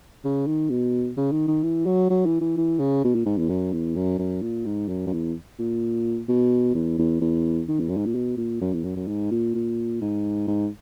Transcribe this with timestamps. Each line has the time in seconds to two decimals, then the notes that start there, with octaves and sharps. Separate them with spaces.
0.24 C#3
0.47 D#3
0.70 B2
1.17 C#3
1.32 D#3
1.48 D#3
1.63 E3
1.86 F#3
2.10 F#3
2.26 E3
2.41 E3
2.57 E3
2.79 C#3
3.04 B2
3.15 A#2
3.26 G#2
3.38 E2
3.49 F#2
3.72 E2
3.96 F#2
4.19 F#2
4.42 A#2
4.65 G#2
4.88 F#2
5.06 F#2
5.13 E2
5.59 A#2
6.28 B2
6.74 E2
6.98 E2
7.21 E2
7.68 D#3
7.80 E2
7.88 F#2
7.97 G#2
8.06 A#2
8.15 B2
8.37 A#2
8.61 F#2
8.73 E2
8.84 F#2
8.96 F#2
9.07 G#2
9.31 A#2
9.55 A#2
10.01 G#2
10.47 G#2